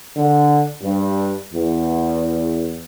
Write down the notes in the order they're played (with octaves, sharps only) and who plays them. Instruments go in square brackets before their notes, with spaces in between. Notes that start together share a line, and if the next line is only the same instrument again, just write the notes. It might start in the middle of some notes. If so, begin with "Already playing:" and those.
[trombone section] D3
G2
E2